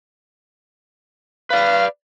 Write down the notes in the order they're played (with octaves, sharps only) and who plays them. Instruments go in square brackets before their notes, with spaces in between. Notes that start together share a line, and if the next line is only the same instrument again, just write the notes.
[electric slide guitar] B4 D5 [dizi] F5